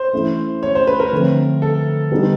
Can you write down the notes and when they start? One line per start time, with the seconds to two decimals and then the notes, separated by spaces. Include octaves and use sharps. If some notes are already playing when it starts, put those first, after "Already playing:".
Already playing: C5
0.13 E3 A3 C#4 E4
0.63 C#5
0.75 C5
0.87 B4
1.00 A#4
1.13 D3 F3 A3 C4
1.62 A4
2.12 D3 G3 B3 D#4